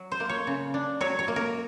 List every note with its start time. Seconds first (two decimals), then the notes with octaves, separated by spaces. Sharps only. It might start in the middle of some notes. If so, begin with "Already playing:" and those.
Already playing: F#3
0.12 C5
0.20 A#3
0.29 C#5
0.47 C#3
0.74 D4
1.01 F#3 C#5
1.19 C#5
1.28 A#3
1.36 A#4